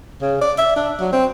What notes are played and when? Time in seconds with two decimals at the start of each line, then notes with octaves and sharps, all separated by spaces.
0.21 C#3
0.41 D5
0.58 E5
0.76 D4
1.00 F#3
1.13 C4